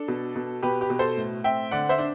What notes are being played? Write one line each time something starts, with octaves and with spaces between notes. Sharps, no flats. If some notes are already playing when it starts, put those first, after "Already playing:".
Already playing: D4 A4
B2
B2
B2 G4 B4
G4 B4
B2
A4 C5
A2
C4 E5 G5
D3 D5 F#5
C5 E5
D4